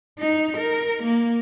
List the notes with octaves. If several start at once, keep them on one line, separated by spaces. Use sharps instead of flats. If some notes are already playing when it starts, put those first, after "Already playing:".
D#4
A#4
A#3